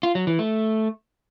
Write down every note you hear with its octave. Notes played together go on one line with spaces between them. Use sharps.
F4
F#3
E3
A3